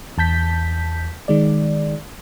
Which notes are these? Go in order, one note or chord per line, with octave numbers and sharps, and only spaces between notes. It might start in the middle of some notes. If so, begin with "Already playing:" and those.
E2 A5 G6 B6
D#3 G#3 D5